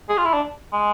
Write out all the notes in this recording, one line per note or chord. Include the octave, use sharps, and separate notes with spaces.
G#4
F4
E4
D4
G#3